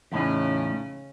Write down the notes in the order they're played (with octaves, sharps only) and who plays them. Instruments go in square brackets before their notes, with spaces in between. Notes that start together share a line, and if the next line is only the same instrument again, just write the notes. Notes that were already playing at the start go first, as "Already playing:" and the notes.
[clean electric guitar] E2 A2 D#4 [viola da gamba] C#3 C#4